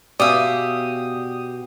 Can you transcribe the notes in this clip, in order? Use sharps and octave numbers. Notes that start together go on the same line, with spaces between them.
B2 G4 D5 E5 F5 G#5 D#6